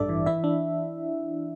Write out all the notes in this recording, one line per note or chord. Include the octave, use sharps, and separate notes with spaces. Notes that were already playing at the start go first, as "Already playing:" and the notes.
Already playing: A1 G2 G3 D4 A4 D5 E5
E3
E3 E4 E5
D4